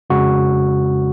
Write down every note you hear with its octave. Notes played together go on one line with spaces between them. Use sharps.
F2 C#3 G#3 F#4